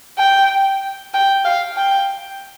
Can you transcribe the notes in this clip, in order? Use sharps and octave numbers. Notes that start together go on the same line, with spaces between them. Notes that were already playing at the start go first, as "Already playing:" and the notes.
G5
G5
F5
G5